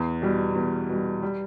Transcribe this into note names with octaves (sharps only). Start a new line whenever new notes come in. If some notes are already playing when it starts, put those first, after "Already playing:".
Already playing: E2
B2 G3
E2
B2 G3
G3